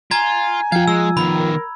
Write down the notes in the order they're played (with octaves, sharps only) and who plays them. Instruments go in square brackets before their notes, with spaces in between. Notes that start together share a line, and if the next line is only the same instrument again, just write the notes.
[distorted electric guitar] F4 [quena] G#5 [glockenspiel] A#5 G#6
[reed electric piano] F3 F4 [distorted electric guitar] F5 G5 [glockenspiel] G#6
[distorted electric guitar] G#3 [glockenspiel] E6
[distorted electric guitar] D#3 B3 [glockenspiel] B5
[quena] A#4